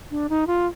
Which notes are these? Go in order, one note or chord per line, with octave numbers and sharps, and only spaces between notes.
D4
D#4
F4